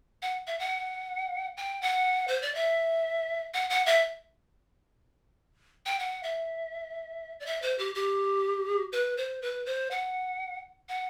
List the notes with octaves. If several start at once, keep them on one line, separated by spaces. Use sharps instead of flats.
F#5
E5
F#5
G5
F#5
C5
D5
E5
F#5
F#5
E5
G5
F#5
E5
D5
E5
C5
G4
G4
B4
C5
B4
C5
F#5
F#5